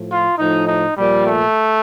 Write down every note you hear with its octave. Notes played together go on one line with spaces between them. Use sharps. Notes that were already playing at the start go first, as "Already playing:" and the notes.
Already playing: A2 F3
F4
A2 F3 D#4
D#4
A#2 F3 G3
A3